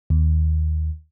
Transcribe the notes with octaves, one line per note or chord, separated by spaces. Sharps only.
D#2